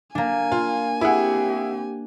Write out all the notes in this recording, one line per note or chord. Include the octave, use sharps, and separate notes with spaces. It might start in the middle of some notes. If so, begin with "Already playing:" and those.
A#3 D4 G#5
F4
C4 E4 G4 G#4 F#5